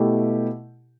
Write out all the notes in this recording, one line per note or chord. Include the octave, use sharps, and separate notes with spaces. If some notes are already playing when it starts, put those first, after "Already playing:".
Already playing: B2 A3 E4 G4